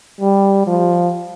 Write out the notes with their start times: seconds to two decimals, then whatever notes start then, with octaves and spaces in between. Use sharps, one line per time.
0.21 G3
0.67 F3